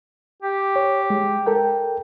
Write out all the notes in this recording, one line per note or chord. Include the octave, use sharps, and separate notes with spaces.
G4
C#5
G#3
A4 A#4 G5